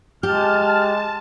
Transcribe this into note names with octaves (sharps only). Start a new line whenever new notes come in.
G#3 G4 A5 F6